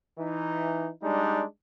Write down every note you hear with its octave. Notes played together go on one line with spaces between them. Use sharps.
E3 D#4
G3 G#3 D4 D#4